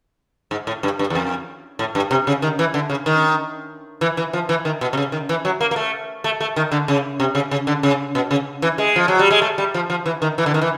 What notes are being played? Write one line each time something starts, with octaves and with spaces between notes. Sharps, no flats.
G#2
A2
G2
G2
E2
F2
A2
G2
C3
C#3
D#3
E3
D3
C#3
D#3
E3
E3
F3
E3
D#3
B2
C3
C#3
D#3
E3
F#3
A#3
A#3
A3
A3
A3
D#3
D3
C#3
C3
C#3
C#3
D3
C#3
B2
C#3
E3
G#3
F3
F#3
G3
G#3
A3
G3
F3
F3
E3
D#3
E3
D3
D#3
E3